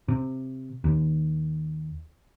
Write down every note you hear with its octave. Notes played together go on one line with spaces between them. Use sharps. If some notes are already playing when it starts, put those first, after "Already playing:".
C3
D#2